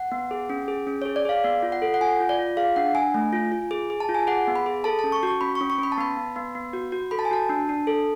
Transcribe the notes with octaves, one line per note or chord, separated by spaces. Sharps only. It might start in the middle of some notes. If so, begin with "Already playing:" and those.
Already playing: F#5
B3
G#4
C#4
G#4
C#4
G#4 C#5
D5
G#4 F5
B3 D5
F4
F#5
A4
F#5
F4 G#5
F4
D5
F4
G#4 F5
D4 F#5
D4 G#5
A3
F4
F4
G#4
G#4
A5
F4
G#5
G#4 F#5
B3
B5
G#4
A4 A5
C#4 A5
C#6
F#4 C#6
C#4 B5
C#6
C#4
C#6
C#4 B5
A5
B3 B5
B3
B3
B3
F#4
F#4
A4 B5
A5
G#5
F#4 A5
D4
D4
A4